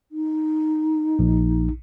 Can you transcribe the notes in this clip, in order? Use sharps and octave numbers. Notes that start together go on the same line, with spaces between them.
D#4
A#1